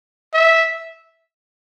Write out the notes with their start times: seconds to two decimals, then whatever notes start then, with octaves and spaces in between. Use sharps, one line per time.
0.34 E5